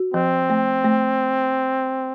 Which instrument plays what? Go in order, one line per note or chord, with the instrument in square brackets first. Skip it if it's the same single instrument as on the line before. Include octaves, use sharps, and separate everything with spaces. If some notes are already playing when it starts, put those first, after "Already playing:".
Already playing: [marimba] F#4
[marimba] F3 [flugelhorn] C4
[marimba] A3
A3